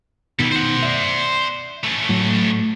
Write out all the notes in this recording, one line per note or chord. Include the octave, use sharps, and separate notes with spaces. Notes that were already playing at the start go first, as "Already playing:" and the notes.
B2 D#3 G3 E4
C5 F#5
D5 E5
A3 C#4
A2 F#3